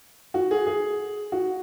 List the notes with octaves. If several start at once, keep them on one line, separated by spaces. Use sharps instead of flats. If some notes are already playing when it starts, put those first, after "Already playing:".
F#4
G#4
G#4
F#4